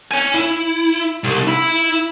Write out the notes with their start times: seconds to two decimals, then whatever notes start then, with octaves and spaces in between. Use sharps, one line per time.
0.11 C#5 G#5
0.34 E4
1.24 C2
1.47 E4 B5